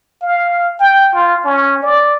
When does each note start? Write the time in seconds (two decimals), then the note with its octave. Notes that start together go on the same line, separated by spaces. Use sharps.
0.22 F5
0.80 G5
1.14 F4
1.45 C#4
1.83 D5